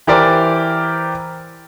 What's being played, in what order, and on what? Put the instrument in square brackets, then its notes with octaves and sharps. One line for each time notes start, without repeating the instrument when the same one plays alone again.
[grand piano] E3 E4 G4 A#4 C5 D5